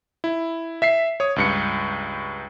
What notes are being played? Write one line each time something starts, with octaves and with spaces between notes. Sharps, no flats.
E4
E5 B6 C7
C#5 D#6
C#2 G2 C#7